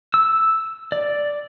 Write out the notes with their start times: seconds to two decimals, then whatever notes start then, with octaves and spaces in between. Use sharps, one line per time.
0.14 E6
0.92 D5